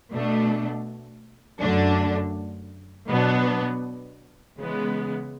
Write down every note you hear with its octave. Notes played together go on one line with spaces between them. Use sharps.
B2 A3 D4
F#2 D3 A3 D4
B2 F#3 B3 D4
C#3 E3 G#3 B3